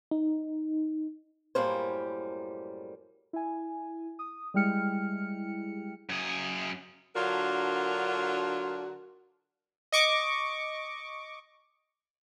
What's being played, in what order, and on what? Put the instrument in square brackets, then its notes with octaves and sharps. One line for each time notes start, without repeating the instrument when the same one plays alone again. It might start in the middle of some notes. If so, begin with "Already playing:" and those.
[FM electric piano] D#4
[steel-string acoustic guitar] F#2 A2 G3 A#3 C5
[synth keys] E4 G#5
D#6
G3 G#3 E4 G5 F6 C#7
[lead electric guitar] F#2 G#4
[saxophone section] D3 F#3 D4 F4 F#4 A#4
[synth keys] D#5 C#6 D6